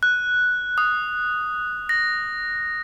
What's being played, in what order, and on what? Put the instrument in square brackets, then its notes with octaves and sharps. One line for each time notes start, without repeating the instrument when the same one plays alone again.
[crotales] F#6
D#6
A#6